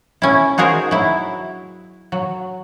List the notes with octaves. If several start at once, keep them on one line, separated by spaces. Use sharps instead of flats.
C#4 E4
D#4 F#4 G#4 A#4 C5
F#3 E4
F#3